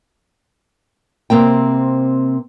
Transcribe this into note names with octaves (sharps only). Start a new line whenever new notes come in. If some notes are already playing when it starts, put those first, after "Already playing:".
C3 A#3 C4 G5